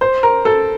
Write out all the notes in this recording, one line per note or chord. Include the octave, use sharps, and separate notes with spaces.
C5
A#4
A4